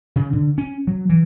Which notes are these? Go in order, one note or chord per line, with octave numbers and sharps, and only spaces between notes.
C#3
D3
C#4
F#3
E3